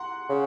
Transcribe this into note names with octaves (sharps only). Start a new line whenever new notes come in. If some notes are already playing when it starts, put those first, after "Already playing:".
Already playing: F#5 A#5 C6
C#3